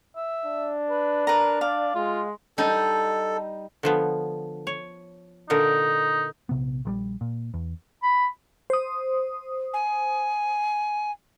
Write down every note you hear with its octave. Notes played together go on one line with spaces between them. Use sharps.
E5
D4
B4
A#4 B4 A#5
D5 F5
G#3 F4
G3 D#4 A4
D3 F3 B3
C#5
A#2 D3 D#4 A#4
A#1 C3 B3
A#1 F3 G3
A#2
E2
B5
C5 D#6
G#5